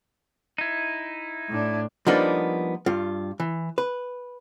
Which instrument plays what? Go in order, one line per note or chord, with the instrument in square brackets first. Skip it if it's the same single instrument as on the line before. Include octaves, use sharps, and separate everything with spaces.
[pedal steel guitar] D#4 E4
[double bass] A2 D4
[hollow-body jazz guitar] F3 G3 A#3 B3 D4 D#4
G2 F4
E3
B4